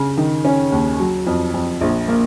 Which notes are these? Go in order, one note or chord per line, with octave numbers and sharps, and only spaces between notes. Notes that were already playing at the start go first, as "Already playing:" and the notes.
Already playing: C#3
D#3
C#4
D#2
F#3
F2
F2
A#1
A#3